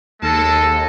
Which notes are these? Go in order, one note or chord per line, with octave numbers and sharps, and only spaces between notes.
D#2 G#3 A4 A5